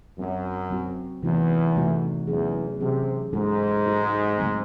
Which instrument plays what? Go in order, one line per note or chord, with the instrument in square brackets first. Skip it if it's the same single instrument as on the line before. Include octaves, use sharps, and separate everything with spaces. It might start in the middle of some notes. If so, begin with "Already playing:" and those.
[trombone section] F#2 [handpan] F#3 C4 F#4
[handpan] F#3 C4 F#4
[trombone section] E2 [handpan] C3 E3 A3 D#4 F#4
[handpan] C3 E3 A3 D#4 F#4
[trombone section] E2 [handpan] F#3 C#4 G#4
[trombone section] C3 [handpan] F#3 C#4 G#4
[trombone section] G#2 [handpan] G#3 D#4 F#4 A4
[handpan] G#3 D#4 F#4 A4
C#3 F#3 A3 C4